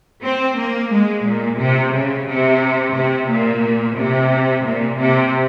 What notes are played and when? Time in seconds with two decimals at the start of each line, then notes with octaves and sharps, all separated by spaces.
0.24 C4
0.58 A#3
0.91 G#3
1.25 A#2
1.59 C3
1.93 C#3
2.27 C3
2.95 C3
3.29 A#2
3.97 C3
4.64 A#2
4.99 C3